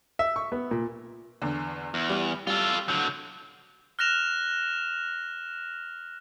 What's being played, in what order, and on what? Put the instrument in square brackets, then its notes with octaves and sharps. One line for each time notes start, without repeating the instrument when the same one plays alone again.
[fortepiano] E5
C#6
B3
A#2
[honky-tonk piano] E2 D3
[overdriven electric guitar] E2
[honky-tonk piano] G3
[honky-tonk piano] G3 [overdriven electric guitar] F4 A4
[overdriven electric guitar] D3 F#3 [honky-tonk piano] G6
[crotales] F6 F#6 A#6 E7 F7